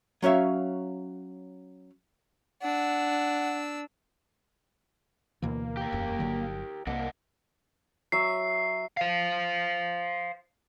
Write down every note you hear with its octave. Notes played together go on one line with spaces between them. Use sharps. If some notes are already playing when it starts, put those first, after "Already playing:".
F#3 C#4 C#5 E5 F5
D4 F#5 E6
D2 B2 E3 A#3
G4 A#4
E1 F#2
G1 D3 F#3
C2 A#3 D4 D#5 F#5
F#3 E5 C7
C5 F5